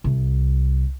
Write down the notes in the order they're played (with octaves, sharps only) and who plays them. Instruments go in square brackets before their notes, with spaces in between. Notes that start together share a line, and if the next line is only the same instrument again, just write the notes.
[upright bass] C2